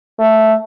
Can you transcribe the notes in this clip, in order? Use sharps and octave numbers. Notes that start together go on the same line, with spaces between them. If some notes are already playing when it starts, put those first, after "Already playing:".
A3